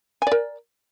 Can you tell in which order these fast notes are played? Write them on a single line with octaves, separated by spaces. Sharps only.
G#5 D5 A#4